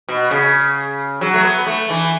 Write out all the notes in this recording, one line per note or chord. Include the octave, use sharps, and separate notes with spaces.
B2
C#3
F#3
A3
B3
A3
E3